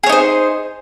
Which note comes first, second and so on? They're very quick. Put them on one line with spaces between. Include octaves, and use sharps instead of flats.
G#4 C#5 D#4 C5